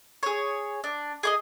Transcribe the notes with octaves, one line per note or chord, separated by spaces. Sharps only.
G#4 C#5
D4
G#4 D5 D#5